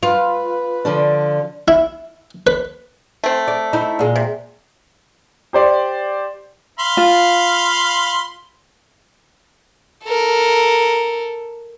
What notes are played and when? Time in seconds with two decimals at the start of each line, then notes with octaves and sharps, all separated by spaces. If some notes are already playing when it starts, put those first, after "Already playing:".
0.03 F4 B4
0.85 D3 F3 D4
1.68 E4
2.47 B4
3.24 A3 C4
3.48 D5
3.73 D#4 E4
3.99 A#2 G#3
4.16 C3
5.53 G4 C5 D5
6.80 F5 B5 C6
6.97 F4
10.04 A4 A#4